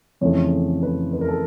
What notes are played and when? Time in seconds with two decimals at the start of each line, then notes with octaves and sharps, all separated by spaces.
0.21 F2 C#3 E3 A3 C#5
0.83 B4
1.13 B4
1.21 A#4
1.29 A4